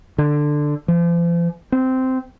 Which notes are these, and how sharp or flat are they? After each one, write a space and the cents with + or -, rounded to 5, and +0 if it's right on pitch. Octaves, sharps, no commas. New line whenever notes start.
D3 +10
F3 -40
C4 -10